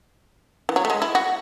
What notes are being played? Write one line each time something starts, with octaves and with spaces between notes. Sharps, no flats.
E3
F#3
A3
G#3
E4
F#4